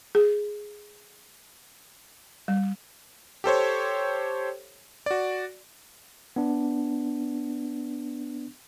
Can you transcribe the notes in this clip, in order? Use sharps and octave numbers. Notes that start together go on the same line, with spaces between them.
G#4
G3
G4 A4 C5 C#5
F#4 D5
B3 D4